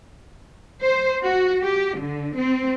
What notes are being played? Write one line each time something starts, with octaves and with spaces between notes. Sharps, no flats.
C5
F#4
G4
D3
C4